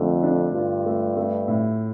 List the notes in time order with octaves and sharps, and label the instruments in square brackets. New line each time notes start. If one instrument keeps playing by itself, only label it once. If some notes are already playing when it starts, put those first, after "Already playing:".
Already playing: [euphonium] F2 [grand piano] D3 A3 D4
[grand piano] D4
[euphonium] G2 [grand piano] F4
[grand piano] A3
A3
A2